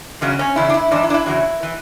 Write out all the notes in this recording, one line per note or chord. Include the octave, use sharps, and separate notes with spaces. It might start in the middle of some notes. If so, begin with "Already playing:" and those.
E2 C#3 F#3 C#4
C#4
E2 C#3 E4
D4
E4
G#2 E3 D4
E4
D4
E4
E2 C#3 F#3
E3